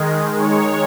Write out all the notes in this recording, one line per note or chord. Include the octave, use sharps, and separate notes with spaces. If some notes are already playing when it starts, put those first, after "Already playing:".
Already playing: D#3 G#3
C#5